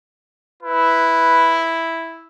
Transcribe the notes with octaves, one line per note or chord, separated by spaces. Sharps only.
E4 B4